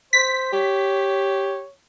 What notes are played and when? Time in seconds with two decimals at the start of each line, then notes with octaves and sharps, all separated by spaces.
0.13 C5 B6
0.53 G4 C#5